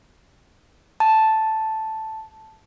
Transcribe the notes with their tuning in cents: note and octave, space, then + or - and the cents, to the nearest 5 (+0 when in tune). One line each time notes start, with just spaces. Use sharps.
A5 +0